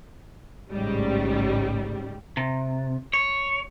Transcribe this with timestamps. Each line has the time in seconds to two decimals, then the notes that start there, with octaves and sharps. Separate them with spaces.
0.71 A1 G#2 C#3 G3
2.37 C3
3.13 C#5